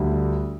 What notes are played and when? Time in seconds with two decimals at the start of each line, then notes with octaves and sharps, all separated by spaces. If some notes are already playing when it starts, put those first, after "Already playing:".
Already playing: D2 D3 G3